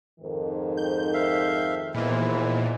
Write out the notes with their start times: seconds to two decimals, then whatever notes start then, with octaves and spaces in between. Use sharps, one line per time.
0.20 F2 G#2 D#3
0.77 G6
1.14 E5 F5
1.94 D#2 A#2 E3 F3 G#3 B3 E4